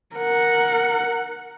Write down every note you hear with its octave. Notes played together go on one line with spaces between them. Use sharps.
A#4 F#5